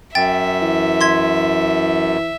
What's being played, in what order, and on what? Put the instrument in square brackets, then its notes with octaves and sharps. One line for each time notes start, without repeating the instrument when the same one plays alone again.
[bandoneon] F#2 [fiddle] E5 [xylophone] G5 A6
[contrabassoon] E3
[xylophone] C6 G#6 B6